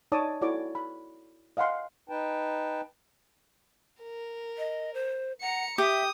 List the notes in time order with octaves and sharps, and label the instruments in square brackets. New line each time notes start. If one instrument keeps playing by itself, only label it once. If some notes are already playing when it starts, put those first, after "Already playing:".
[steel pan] D#4 C#5 D5 A5 D6 D#6
E4 F#4 A4 C#5 D5 D6
B5
D#5 F5 F#5 G#5 C6
[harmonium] D#4 B4 G5 A5
[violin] A#4
[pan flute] D#5
C5
[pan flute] F#5 [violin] A#5 C#7
[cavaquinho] G4 [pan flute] E5 [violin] D#6